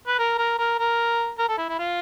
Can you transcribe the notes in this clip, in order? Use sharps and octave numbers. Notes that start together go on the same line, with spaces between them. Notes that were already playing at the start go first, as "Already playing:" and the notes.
B4
A#4
A#4
A#4
A#4
A#4
A4
E4
E4
F4